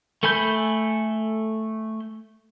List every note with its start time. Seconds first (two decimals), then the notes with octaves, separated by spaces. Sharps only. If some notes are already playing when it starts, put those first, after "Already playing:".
0.23 A3 A4 G#5 B5 G6